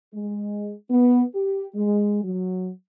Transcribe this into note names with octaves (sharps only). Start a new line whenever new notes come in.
G#3
B3
G4
G#3
F#3